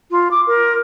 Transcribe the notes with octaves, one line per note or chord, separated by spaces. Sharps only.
F4
D6
A#4